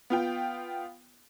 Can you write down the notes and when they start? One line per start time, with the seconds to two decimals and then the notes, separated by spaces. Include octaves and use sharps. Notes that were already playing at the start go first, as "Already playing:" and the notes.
0.10 B3 F4 G5